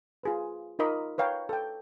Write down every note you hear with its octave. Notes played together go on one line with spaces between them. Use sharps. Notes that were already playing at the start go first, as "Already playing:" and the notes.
F4 G#4 B4
D#4 F4 A#4 D#5 B5 D6
B4 C#5 F5 G5 A#5
A4 G5